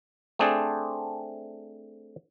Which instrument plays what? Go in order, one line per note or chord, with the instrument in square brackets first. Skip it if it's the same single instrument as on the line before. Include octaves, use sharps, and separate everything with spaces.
[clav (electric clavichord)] A3 C4 D4 G#4 C5 D5